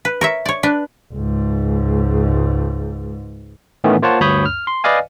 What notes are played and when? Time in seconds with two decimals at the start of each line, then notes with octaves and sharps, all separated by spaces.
0.05 B4
0.21 A#4 C#5 E5
0.45 C#5 D5
0.63 D4 B4
1.13 C#2 G#2
3.84 A2 D#3 E3 A3 B3 C#4
4.02 A#3 F4 C5 C#5 F#5 A5
4.20 D2 G2 C#5 B5 D#6 G6
4.45 F6
4.67 C6
4.84 B4 D5 D#5 F5 G#5